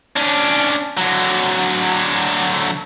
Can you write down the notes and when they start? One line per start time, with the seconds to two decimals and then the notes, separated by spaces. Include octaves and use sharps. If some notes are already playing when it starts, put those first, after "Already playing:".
0.16 C#4 D4
0.97 D3 F#3